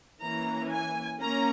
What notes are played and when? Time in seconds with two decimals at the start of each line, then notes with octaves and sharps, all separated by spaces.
0.21 E3 A#3 C#4 A#5
0.71 G#5
1.21 A#3 C#4 A#5